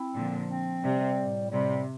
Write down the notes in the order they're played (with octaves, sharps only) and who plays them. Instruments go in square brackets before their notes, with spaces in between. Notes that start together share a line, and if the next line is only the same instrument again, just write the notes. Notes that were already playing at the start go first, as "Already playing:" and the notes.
Already playing: [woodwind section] C4 E4
[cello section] A#2 D3 [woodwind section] F3
[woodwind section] C4
[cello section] C3 [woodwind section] G3
[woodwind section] A2
[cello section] C3 [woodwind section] G3